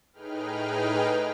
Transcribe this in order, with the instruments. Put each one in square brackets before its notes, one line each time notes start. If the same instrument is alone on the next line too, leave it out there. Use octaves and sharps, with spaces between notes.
[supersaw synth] A2 D#4 G#4 B4 G5 F6